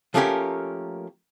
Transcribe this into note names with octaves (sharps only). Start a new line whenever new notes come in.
F3 A3 A#3 C#4 G4 A#4